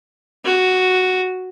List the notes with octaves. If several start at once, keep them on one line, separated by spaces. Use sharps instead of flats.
F#4